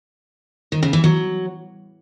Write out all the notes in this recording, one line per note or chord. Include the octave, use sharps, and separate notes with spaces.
D#3
C#3
E3
F#3